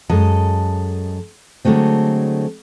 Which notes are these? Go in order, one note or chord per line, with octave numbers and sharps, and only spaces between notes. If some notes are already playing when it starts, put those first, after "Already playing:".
F#2 G#3 A4 D#5
D3 F#3 G#3 A3 C4